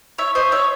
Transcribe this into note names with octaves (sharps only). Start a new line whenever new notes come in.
C#5 E5 C#6
C5 D#5
C#5 E5